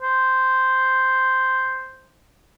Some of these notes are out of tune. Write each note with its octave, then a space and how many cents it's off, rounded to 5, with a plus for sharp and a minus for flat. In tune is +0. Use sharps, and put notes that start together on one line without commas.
C5 -5